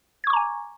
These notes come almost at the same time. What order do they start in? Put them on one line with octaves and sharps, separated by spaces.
G#6 C#6 D6 A#5 G#5